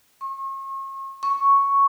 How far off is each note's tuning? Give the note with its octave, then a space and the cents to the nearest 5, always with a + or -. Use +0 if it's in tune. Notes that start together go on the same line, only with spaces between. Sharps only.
C#6 -40
C#6 +0